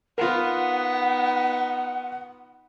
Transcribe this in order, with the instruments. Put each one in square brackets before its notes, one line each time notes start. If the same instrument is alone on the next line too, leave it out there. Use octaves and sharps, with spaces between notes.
[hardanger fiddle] B3 D#4 [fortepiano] F4 A#4 [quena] F#5